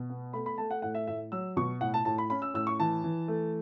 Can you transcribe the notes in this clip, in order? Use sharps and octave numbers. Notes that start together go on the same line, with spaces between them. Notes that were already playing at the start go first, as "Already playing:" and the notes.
Already playing: B2
B3
A3 B5
B5
A3 A5
F#5
A2 F#5
E5
A2 E5
F#3 E6
B2 C#6
A2 F#5
A5
A2 A5
B5
C#4 B5
E6
A2 E6
C#6
E3 A5
E3
A3